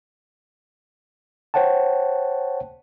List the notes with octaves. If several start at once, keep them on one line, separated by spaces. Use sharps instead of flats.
C5 C#5 F#5 G5 A5